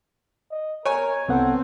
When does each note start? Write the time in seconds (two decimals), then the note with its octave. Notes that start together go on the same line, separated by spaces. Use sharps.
0.51 D#5
0.85 A#4 C#5 G#5
1.29 C2 B3 C4 A4 F#5